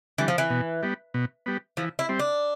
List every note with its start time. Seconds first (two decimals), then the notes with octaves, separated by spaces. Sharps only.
0.18 D3 E3 G3
0.28 F3
0.38 E3
0.50 B2
0.83 G3 B3
1.14 B2
1.46 G3 B3
1.77 E3 F3
1.99 E4
2.09 G3 C4
2.19 D4